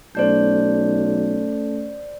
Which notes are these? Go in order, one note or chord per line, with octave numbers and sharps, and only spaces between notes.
B1 A3 C#4 A4 C5 D5 G6